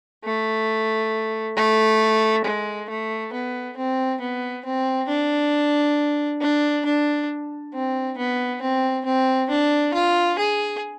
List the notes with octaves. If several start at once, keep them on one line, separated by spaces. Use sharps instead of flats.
A3
A3
G#3
A3
B3
C4
B3
C4
D4
D4
D4
C4
B3
C4
C4
D4
F4
G#4